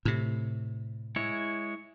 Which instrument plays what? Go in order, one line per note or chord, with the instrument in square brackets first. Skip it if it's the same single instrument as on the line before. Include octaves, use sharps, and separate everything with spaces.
[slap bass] A2 C3
[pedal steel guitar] G#3 E4 C#5